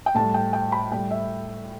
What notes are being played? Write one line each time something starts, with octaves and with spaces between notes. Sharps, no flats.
G5
A2 G3 A5
G5
G5
B5
A2 G3 G5
E5